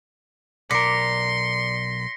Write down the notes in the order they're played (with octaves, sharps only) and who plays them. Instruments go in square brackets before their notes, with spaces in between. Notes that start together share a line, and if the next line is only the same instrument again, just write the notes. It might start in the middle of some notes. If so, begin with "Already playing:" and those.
[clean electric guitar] B1 A#4 [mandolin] D5 [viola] C6 [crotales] A#6 B6 C#7